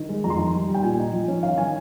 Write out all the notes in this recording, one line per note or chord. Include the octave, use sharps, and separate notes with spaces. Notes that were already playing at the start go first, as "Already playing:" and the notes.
Already playing: D#3
G#3
F2 A#5
C6
D#3 A#5
G3
G3
G5
A#2 G#5
D#4
F3
C#4
D#3 F5
D#3 G#5